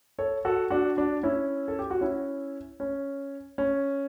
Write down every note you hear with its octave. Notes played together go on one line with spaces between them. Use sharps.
A4 C#5
F#4 A4
D4 F#4
D4 F#4
C#4 E4
A4
G4
F#4
C#4 E4
C#4
C#4